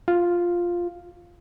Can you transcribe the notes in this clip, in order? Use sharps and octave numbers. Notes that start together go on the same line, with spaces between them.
F4